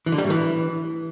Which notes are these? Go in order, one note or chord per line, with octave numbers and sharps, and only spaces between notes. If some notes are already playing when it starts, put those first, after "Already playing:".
E3
D3
G3
A2
E3